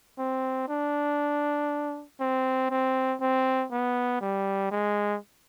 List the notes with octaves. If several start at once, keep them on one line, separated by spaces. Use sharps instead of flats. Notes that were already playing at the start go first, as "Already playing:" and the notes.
C4
D4
C4
C4
C4
B3
G3
G#3